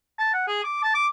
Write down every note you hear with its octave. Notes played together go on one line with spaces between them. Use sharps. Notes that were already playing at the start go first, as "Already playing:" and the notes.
A5
F#5
G#4
D6
A5
D6